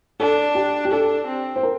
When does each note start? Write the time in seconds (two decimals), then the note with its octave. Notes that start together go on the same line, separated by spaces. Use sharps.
0.20 D4 A4
0.55 G4
0.85 G4
0.91 D4 A4
1.27 C4
1.56 C5
1.63 A#4